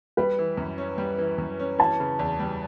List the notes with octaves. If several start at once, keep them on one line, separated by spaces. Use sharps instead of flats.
G3 B4
E3
F#2
C#4
G3
E3
F#2
C#4
E3 A5
C#3
E2
G3